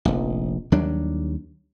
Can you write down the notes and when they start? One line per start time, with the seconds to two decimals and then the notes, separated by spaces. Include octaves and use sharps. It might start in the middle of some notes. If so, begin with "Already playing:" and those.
0.05 F1 A#1
0.72 D#2 F#3 G3 D4